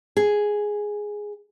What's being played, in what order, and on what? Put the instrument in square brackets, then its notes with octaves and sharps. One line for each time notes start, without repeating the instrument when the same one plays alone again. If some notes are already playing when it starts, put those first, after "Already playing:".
[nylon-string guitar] G#4